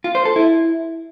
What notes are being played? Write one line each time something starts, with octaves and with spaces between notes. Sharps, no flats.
F4
C5
A4
E4